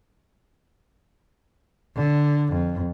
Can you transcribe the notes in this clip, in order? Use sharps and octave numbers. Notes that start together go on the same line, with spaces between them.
D3
F2